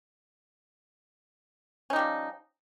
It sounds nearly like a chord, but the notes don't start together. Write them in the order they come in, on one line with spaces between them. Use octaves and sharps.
C#4 D#4 G3 F3